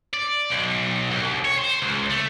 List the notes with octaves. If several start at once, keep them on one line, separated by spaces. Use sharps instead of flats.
D5
B1
C2
C#5
C5
C#2
A3